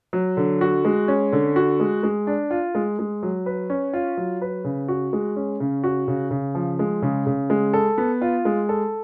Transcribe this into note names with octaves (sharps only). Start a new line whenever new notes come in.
F#3
D3
F#4
G#3
C#4
D3
F#4
G#3
G#3
D4
F4
G#3
G#3
F#3
B4
C#4
F4
F#3
B4
C#3
F#4
G#3
C#4
C#3
F#4
C#3
C#3
F3
G#3
C#3
C#3
G#3
A4
B3
F4
G#3
A4